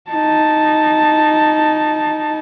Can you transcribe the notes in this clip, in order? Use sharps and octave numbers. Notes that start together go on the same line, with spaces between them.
D#4 A5